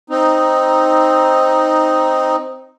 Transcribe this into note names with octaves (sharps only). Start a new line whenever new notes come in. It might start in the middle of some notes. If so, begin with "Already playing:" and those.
C4 D#4